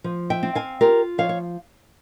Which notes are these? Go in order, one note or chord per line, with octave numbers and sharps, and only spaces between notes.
F3
E5 G5
C4
F5 G#5
F4 G4 A#4
F3 C#5 F5
C#5